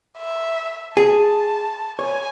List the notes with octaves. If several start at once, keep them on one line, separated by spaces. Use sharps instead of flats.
E5
G#4 A5
C#5 G#5